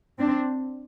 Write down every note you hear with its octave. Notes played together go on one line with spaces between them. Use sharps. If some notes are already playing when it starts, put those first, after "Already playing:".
C4 D4